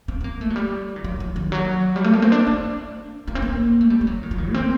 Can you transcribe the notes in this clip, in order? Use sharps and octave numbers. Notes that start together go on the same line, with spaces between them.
C4
C4
A#3
A3
F#3
G3
D#3
F#3
F#3
D#3
F#3
G3
A3
A#3
C4
D4
D4
A#3
C4
A#3
A3
G3
G3
F#3
D#3
F#3
D#3
A#3
C4